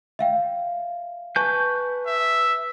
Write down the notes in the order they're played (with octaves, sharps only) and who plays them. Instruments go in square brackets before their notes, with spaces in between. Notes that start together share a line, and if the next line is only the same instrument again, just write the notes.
[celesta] E5 F5 G5
[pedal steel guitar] B4 G6 [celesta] G#5 A5 C#6
[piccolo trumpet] E5